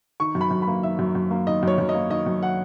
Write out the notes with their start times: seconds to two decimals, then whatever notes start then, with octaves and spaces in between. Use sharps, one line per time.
0.20 D#3 C#6
0.35 F#2
0.41 B5
0.51 F#2
0.62 B5
0.68 A#3
0.83 D#3 E5
0.99 F#2
1.15 F#2
1.31 A#3
1.47 D#3 D#5
1.63 F#2 C#5
1.78 F#2
1.89 D#5
1.94 A#3
2.10 D#3 D#5
2.26 F#2
2.43 F#5